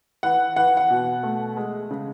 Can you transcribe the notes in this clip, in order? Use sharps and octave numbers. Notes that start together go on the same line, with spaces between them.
E3 F#5
E3 F#5
F#5
B2
A3
G#3
C#3